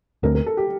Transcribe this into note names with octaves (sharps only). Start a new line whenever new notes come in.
D2 D3 A3 C4 A#4
A#4
A4
G4